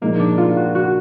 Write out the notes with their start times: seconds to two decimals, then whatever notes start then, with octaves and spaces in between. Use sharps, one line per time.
0.02 A#2 F3 G#3 A#3 D#4
0.19 D4
0.38 F4
0.57 F#4
0.75 F#4